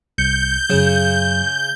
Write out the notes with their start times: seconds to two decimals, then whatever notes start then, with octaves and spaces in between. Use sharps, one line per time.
0.18 C2 G6 C#7
0.70 F#2 C#3 F#3 C#4